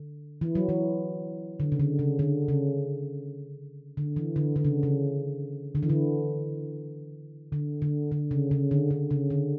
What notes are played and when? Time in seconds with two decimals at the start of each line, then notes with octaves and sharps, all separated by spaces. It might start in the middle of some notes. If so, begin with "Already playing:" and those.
Already playing: D3
0.41 E3
0.55 F#3
0.69 E3
1.60 D3
1.72 C#3
1.80 D3
1.99 C#3
2.19 D3
2.48 C#3
3.97 D3
4.16 E3
4.36 D3
4.56 D3
4.65 C#3
4.83 C#3
5.75 D3
5.83 E3
5.89 D3
7.52 D3
7.82 D3
8.12 D3
8.31 C#3
8.51 C#3
8.71 D3
8.91 D3
9.11 C#3
9.30 D3